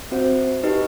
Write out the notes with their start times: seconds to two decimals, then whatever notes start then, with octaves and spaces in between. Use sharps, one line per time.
0.11 C4 F#4 C5 E5
0.64 D#4 G4 B4 D#5